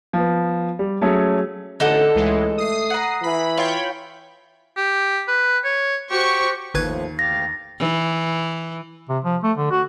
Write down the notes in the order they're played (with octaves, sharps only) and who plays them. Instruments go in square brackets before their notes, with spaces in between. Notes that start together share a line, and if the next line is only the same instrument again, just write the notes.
[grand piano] F3 B3
G3
F#3 A3 C#4 G#4
[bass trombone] A1 [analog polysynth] D3 [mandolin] D#4 A4 F#5
[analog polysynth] C#2 E3 G#3 [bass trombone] A2
[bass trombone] A3 [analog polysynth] D#6 C7
[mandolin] F#5 A#5
[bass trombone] E3 [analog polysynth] B5
[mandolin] F4 [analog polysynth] C#5 G5 B5
[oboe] G4
B4
C#5
[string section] F#4 C5 C#6 [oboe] G4
[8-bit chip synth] G1 B4 G#6 [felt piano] D#2 [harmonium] A2 F3
[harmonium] D2 G4 F5 [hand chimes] A6 A#6
[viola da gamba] E3
[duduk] C3
F3
A3
D3
F#4